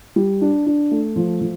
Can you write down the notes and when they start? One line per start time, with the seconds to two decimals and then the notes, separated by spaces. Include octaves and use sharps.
0.16 G3
0.41 D4
0.66 D4
0.91 A3
1.16 F3
1.41 F3